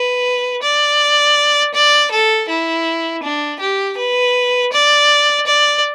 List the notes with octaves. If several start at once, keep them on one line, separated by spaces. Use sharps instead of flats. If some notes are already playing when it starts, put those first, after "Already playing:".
Already playing: B4
D5
D5
A4
E4
D4
G4
B4
D5
D5